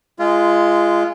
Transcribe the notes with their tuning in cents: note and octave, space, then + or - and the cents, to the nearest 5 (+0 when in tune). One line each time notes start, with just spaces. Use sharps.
G#3 +0 F4 -25